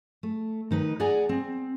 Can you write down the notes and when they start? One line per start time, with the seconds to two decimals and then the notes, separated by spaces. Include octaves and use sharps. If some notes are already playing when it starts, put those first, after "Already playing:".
0.23 A3
0.71 D#3 D#4 B4
1.00 G#4 D5 F#5 G#5 A#5
1.29 C4